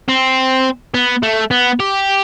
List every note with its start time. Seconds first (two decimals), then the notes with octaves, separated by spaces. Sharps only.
0.09 C4
0.94 B3
1.23 A3
1.51 B3
1.80 G4